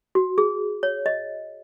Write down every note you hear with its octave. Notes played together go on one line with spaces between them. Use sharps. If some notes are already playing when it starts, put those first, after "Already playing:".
F#4
G#4
C#5
D#5